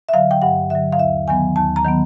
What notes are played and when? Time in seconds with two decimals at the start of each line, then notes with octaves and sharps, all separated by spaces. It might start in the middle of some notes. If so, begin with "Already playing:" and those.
0.09 E5
0.13 D3 F#3 F5
0.31 G5
0.42 G2 F#5
0.70 D3 F#3 E5
0.93 F5
0.99 D#2 E5
1.28 D#3 F#3 B3 G#5
1.56 D#2 A5
1.76 A#5
1.85 D#3 F#3 B3